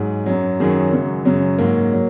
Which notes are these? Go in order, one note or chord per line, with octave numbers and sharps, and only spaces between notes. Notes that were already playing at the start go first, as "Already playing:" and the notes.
Already playing: G#2 F#3 G#4
F#2 F#3
F#2 D#3 F#3 G#4
F#2 C#3 F#3 G#3
F#2 C#3 F#3
G#2 F#3 A#3
F#3